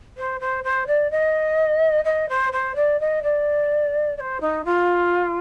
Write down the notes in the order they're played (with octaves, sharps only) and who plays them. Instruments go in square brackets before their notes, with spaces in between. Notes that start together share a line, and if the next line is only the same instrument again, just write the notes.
[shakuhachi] C5
C5
C5
D5
D#5
D#5
C5
C5
D5
D#5
D5
D5
C5
D#4
F4